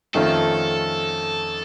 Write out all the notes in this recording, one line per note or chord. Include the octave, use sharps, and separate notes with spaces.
F2 D#3 A3 C#4 F4 A4